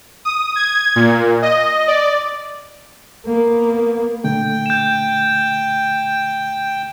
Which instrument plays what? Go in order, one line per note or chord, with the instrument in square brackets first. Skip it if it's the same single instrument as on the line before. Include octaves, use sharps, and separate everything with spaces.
[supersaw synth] D#6
G#6
A#2
D#5
D5
[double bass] A#3 B3
[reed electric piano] A#2 D3 A3 [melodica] G5
[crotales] G6 E7